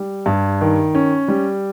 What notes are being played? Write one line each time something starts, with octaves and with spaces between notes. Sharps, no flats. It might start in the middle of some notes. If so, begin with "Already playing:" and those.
Already playing: G3
G2
D#3
C#4
G3